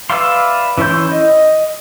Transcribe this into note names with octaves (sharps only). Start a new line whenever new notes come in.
B4 D5 E5 F5 C6
E3 C#4 E4 C6 G6
D#5